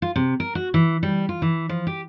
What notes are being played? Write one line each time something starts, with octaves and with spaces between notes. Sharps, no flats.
F4
C3
A#4
F#4
E3
G3
F4
E3
F3
G4